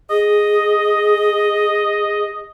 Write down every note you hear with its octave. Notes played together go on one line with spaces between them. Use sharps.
G#4 D#5